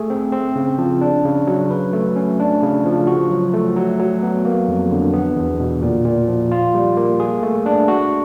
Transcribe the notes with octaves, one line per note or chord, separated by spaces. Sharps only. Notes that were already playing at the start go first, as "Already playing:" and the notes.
Already playing: A3 G#4
C4
C4
C#3
F3
D4
C#3
F#3
B4
A3
C#4
D4
C#3
F3
F#4
F#3
A3
F#3
F#3
B3
A#3
F2
D3
B3
E2
B2
A#2
A#2
F3
F4
G3
A#3
G#4
A3
D4
F#4